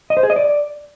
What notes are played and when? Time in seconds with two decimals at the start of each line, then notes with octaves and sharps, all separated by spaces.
0.10 D#5
0.17 C5
0.23 G#4
0.30 D#5
0.36 D5